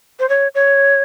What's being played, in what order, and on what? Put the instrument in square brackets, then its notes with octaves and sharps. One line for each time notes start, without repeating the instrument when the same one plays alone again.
[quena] C5
C#5
C#5